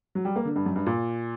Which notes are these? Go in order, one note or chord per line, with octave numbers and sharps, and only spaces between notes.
F#3
G3
A#3
D3
G2
F#2
G2
A#2